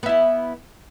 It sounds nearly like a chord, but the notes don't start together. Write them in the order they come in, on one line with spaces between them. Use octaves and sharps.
B3 E5 E4